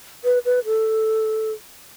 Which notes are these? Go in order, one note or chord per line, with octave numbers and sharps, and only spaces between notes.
B4
B4
A4